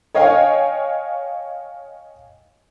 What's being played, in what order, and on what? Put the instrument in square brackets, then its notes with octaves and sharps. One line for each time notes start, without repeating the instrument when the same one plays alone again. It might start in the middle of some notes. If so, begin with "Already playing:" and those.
[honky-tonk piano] C#5 D#5 F5 G5 G#5